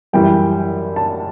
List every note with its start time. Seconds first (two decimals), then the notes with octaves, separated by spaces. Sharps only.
0.13 F#2 E3 G3 G5
0.96 A5